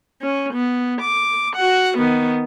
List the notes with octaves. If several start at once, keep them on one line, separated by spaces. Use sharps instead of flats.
C#4
B3
D6
F#4 F#5
D#3 B3